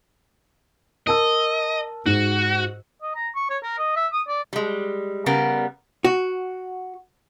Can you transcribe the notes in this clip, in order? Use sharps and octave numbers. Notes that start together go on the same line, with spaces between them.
A#4 D#5 A5 E6
G#2 F#4
D#5
A#5
C#6
C#5
A#4
D#5
E5
D#6
D5
G3 G#3
C#3 G3 B3 A#4
F#4